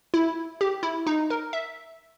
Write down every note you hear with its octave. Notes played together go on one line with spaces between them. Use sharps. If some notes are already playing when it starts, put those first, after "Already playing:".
E4
G4
E4
D#4
A#4
E5